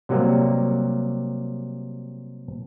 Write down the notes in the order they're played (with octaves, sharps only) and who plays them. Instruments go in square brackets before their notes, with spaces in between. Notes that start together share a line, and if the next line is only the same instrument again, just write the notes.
[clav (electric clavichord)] C3 F#3 G3 A#3